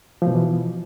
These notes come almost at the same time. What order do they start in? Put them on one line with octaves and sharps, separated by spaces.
F3 B2 E3